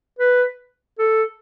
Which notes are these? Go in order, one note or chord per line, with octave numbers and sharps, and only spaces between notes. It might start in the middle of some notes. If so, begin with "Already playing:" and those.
B4
A4